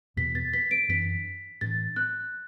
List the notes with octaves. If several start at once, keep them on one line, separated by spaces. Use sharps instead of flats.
E2 B2 B3 B6
A6
B6
D7
F#2 E3 D4 B6
A2 E3 D4 A6
F#6